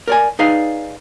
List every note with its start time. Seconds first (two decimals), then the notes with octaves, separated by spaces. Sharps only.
0.08 A#4 D5 G#5
0.39 D#4 G#4 B4 D5 F5